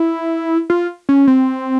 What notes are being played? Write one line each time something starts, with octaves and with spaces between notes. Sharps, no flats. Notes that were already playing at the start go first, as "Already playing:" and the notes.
Already playing: E4
F4
C#4
C4